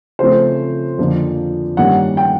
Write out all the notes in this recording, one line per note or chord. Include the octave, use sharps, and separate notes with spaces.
C#3 F3 A3 C4 C5
F2 D3 F3 A#3 D4
G2 D#3 G3 A#3 C#4 F#5
G5